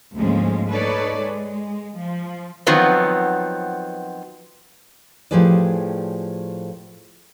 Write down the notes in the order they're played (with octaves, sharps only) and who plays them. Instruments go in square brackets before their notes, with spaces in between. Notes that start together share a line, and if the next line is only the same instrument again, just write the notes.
[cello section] D2 G#2 F3 G#3 A#3 C#4
D#4 A4 B4 C#5 D5
G#3
F3
[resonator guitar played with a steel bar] D#3 F3 F#3 B3 C4
[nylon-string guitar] A2 F3 G4 G#4 B4 D5